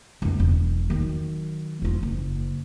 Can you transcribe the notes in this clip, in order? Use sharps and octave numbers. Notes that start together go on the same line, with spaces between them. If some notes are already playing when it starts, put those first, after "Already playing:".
C#2 F#2
E1
D#3 F#3
E1 F4
F#1